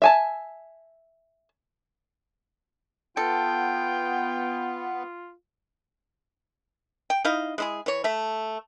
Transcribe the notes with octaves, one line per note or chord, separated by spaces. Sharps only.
E5 G#5 A5
B3 F4 A4 G5
G5
D#4 E4 D#5 F5
G#3 E4 G#4
E3 C#5
A3 E5